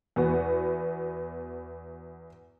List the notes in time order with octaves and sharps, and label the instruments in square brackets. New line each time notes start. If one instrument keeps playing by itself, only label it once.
[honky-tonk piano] E2 B3 F#4